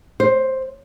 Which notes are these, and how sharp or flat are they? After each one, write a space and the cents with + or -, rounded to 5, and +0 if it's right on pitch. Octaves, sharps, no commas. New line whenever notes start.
C5 +10